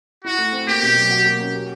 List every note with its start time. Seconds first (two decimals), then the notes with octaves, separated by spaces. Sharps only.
0.25 E4 F#4
0.38 A3
0.52 C4
0.68 A#3 G4
0.82 B2
0.96 F#3
1.10 F#4
1.25 A#3
1.40 C#4
1.53 G4